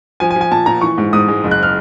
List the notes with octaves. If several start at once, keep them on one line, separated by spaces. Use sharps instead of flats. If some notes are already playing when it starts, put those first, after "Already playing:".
F3 G#5
G#5
F3
G#5
A#2 A5
A#2 A#5
E3 C#6
G#2
G#2 D#6
G#3
F#1
F#6
F6